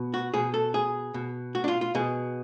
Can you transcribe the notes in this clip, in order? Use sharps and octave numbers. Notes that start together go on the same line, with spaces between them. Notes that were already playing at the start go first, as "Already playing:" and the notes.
Already playing: B2
F#4
B2 G#4
A4
G#4
B2
F#4
D4
F4
F4
B2 G#4